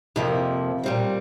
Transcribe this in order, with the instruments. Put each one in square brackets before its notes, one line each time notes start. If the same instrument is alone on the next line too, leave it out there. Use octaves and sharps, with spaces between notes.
[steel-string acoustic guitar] F2 C3 F3 A#3
A#2 G3 C4